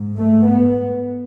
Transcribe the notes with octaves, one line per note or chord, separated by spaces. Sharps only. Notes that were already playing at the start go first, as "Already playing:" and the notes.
Already playing: G#2
A3
B3